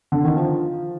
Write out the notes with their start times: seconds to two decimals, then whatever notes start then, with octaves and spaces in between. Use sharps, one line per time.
0.12 D3
0.25 D#3
0.36 F3